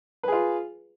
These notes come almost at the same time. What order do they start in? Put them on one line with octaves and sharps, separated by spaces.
B4 G#4 F4